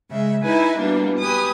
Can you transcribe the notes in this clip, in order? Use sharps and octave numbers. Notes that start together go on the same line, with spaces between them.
C#3 G#3 E5
D#4 E4 B4 E5 G#5
B2 E3 G3 A#3 D4
G4 B4 G#5 D#6